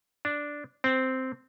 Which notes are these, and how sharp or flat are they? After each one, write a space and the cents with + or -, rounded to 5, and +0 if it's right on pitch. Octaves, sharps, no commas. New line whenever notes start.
D4 -5
C4 -5